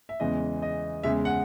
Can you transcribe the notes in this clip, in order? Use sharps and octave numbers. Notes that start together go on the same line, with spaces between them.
E5
E2 C#3 E3 G#3 D#5
D#5
E2 C#3 G#3 E5
F#5